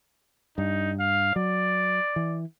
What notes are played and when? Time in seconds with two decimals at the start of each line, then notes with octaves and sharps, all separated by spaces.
0.58 G2 D#4
1.00 F5
1.36 F#3 D5
2.16 E3